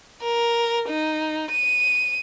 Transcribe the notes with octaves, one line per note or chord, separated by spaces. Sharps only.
A#4
D#4
D#7